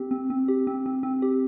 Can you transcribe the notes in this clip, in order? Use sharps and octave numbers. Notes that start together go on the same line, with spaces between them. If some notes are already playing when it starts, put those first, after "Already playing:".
Already playing: C4 G4
C4
C4
G4
C4
C4
C4
G4